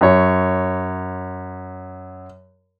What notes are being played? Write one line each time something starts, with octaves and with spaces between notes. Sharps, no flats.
F#2 C#5